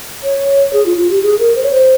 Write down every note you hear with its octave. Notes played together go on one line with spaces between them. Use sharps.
C#5
G#4
F4
F4
G4
G#4
A#4
C5
C#5
C5